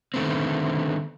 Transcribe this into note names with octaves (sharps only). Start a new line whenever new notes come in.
D3 D#3 G#3 A3 B3 C4